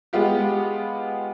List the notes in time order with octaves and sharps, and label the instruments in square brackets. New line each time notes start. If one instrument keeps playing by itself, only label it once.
[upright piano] G#3 B3 F4 G4